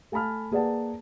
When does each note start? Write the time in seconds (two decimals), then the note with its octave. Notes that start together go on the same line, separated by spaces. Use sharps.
0.12 A3 G#5 A5 B5 F6
0.52 A#3 G#4 B4 D5 F#5 A5